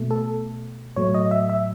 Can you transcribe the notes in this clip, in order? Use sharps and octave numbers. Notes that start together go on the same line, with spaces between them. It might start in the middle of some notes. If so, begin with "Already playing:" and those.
Already playing: B2 A3
A4
A2 F#3 A3 C#5
D#5
E5
E5